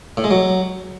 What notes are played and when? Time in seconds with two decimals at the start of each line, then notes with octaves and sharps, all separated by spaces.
0.17 A2
0.24 G#3
0.31 F#3